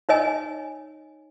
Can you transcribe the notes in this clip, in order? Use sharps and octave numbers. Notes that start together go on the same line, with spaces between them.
D#4 C#5 D#5 G#5